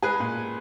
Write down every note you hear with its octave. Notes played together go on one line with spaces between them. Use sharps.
G#3 G#4 B4
A#2